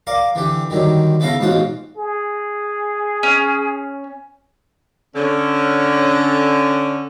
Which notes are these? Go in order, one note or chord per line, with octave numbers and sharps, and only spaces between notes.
A#4 D5 F5
D3 E3 G4
D3 D#3 F#3 G3
C#3 B3 E4 A4 F5 A#5
A1 G#2 B2 C#4 F4 F#5
G#4
C#4
D3 C#4